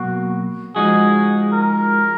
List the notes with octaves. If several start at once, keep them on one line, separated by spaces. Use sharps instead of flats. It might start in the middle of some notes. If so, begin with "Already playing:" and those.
Already playing: B2 F#3 A#3 F#4
F3 G#3 D#4 F#4 G#4
A#4